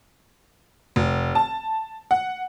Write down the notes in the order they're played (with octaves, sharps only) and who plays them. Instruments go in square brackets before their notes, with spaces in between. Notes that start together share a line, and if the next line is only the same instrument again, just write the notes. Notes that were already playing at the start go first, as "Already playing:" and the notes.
[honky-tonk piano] F1
A5
F#5